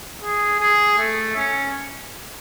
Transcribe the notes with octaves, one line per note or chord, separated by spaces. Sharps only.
G#4
G#4
A3
C#4